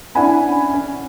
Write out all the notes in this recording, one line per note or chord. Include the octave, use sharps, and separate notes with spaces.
C#4 D4 E4 F#5 G#5 B5
C#4